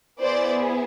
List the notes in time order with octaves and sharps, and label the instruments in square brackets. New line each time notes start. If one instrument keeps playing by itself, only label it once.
[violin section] B3 E4 G#4 C5 D5